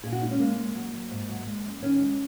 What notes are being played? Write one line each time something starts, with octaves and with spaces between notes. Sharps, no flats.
A#2 G#4
F#4
G#3 D#4
C#4
G#3 A#3
G#3
F#3
F#3
G#2
F#3
G#3
F#2
D#3 C#4
G#3